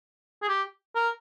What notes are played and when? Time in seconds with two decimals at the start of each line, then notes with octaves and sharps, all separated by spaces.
0.42 G#4
0.48 G4
0.95 A#4